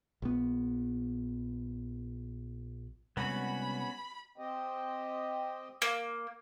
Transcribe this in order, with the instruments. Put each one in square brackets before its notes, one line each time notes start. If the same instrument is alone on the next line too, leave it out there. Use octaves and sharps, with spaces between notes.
[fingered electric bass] A#1 B3
[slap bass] C3 G3 G#3 [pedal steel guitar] B3 C#4 F#4 [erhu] B5
[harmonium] C4 G4 D#5
[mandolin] A#3